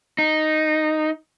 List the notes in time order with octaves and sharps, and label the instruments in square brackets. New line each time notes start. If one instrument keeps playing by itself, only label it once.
[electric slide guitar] D#4